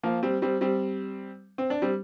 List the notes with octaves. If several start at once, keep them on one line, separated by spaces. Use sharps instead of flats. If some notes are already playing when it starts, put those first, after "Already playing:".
F3 A#3
G3 C4
G3 C4
G3 C4
C4
D4
G3 C4